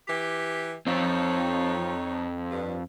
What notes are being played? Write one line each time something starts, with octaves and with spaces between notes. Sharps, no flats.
E3 G4
F2 C4 D#4 C#5
G2